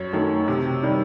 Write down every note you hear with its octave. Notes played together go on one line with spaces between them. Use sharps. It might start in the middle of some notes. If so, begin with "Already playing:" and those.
Already playing: F#2 C#5
D#3 F#3 A3
C3
D#3 G3